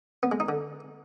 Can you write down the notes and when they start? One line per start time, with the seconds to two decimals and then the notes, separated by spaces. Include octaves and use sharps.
0.23 B3
0.32 G#3
0.40 D#4
0.49 D3